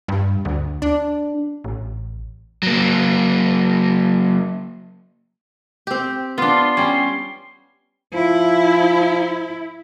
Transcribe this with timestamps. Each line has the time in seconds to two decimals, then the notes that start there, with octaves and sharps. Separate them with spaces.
0.08 G2
0.45 D2
0.82 D4
1.64 A1
2.63 F#3 A#3
5.87 C4 G4
6.38 B3 D4 F4 C6
6.77 G3 C#4
8.14 F3 E4